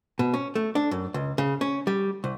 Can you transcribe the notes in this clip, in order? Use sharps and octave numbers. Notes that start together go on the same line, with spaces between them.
B2
C#4
A3
D4
F#2
C#2
C#3
C#4
G3
C2